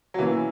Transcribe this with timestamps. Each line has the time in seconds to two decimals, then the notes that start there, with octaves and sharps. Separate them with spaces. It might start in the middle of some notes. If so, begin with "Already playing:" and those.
0.14 F#3
0.19 B2 E3 A#3 C#4 E4